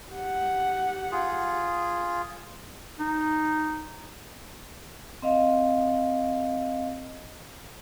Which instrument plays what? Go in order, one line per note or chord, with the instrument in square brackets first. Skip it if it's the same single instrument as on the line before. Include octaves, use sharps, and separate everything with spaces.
[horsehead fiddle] G4 F#5
[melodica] F4 G#4
[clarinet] D#4
[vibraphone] C4 D#5 F5